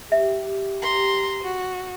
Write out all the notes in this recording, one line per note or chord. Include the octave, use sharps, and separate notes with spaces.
G4 E5
A#5 C6
F#4